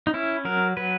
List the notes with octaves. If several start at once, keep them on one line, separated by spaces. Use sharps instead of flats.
D#4
C#4 E4
F#3 A#4
F#3 B4